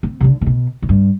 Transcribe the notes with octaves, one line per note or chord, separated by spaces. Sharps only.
C4
C3
D3
C3
B2
A2
G2